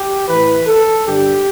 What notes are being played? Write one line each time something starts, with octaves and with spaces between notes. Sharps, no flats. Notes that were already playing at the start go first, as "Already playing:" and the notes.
Already playing: G4
A2 E3 B4
A4
G2 D3 G4